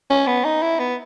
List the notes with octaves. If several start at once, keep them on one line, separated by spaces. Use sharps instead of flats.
C#4
B3
D#4
E4
B3